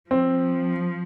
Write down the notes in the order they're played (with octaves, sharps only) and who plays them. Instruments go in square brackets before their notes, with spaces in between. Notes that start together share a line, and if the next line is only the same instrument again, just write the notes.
[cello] F3 [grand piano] C4